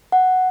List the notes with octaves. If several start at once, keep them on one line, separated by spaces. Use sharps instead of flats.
F#5